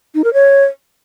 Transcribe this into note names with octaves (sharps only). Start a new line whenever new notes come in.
D#4
A#4
C#5